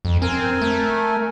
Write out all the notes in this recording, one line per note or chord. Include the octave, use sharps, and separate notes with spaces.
F2
C4 A#4 G#5
A3